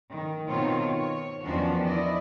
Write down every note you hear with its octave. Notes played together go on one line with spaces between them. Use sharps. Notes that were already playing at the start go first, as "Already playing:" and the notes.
D#3
B2 D#3 C4 F4 C#5
C#5
E2 D#3 F3 C#4 D4 F#4
E4 D5 D#5